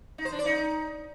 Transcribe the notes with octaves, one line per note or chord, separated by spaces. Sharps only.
D#4
C5
D4
D5
D#4